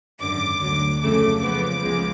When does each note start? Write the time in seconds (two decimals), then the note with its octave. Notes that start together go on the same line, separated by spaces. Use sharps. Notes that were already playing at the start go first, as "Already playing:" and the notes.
0.21 G#1 F#2 D3 D6
0.61 D2 D3 F#3
1.01 F2 C#3 F#3 A3 D6
1.42 C#2 C#3 F3 B3 D6
1.83 C#2 C#3 F3 G#3